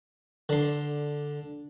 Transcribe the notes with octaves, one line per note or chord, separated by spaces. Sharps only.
D3 C6